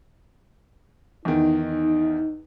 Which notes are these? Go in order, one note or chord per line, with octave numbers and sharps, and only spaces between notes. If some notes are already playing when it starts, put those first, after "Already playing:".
E2 D#3 D#4